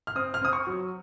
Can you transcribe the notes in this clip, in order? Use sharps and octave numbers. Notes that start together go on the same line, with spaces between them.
F6
C4 D#6
F6
C4 D#6
C#6
F#3